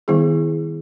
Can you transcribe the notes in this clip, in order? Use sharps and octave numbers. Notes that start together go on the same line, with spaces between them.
D#3 G3 B3 E4 G#4